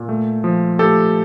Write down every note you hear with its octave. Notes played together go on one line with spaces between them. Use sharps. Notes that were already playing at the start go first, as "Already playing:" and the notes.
Already playing: A#2
A3
F3
A3 G4 A4